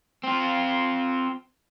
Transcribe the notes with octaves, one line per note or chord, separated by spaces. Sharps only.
C4 F4